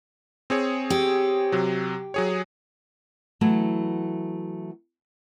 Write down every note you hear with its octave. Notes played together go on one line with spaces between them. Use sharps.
C4 G#4 C#5
G4
C3 F#3
F#3 G#4 C#5
E3 F#3 A3 B3 E4